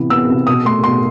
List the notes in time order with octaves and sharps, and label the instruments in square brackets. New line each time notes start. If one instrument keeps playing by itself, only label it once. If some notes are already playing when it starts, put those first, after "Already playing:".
Already playing: [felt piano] C3 E3 B3
B3 E6
C3
B2 D#6
A3 C6
B2 C6